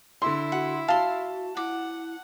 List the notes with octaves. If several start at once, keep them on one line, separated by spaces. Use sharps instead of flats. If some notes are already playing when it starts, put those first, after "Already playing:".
D3 E4 C6
F#4 F#5
F#4 F5 A5 C6
E4 F#5 D6